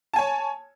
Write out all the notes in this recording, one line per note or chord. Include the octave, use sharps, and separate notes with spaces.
C#5 G#5 A5